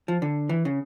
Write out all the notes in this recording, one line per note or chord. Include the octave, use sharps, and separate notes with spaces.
F3
D3
E3
C#3